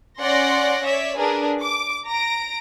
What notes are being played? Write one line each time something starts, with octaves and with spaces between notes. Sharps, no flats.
C#4 D5 F#5 C6 A#6
C#5 D5 E5
D4 G#4 A#4 B4
D6
A#5 A#6 D7